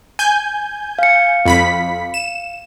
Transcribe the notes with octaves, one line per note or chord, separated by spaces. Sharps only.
G#5 G6
F5 C#7
F2 B5 B6
E7